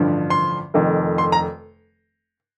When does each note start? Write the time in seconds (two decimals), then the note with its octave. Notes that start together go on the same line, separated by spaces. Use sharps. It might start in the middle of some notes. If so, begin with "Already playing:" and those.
Already playing: A1 G2 D3 F3
0.30 C6
0.74 F1 F2 D#3
1.18 C6
1.32 A#5